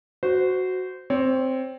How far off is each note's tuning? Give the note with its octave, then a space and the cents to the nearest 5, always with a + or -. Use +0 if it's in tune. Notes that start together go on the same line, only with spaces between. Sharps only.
F#4 +0 C5 -20
C4 +0 C#5 +25